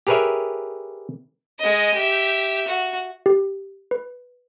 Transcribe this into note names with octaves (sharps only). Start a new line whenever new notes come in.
G4 G#4 A#4 B4 C#5 E5
G#3 D#5
G4 E5
F#4
G4
B4